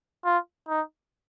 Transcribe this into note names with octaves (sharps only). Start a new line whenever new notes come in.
F4
D#4